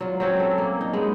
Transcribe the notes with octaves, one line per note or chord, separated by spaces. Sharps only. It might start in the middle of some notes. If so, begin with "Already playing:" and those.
F#3 F4
F#3 C4 C#4
A4
A#3
D#4
G#3 B3